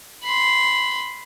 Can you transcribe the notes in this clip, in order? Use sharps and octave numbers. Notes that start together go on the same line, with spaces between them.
B5 C6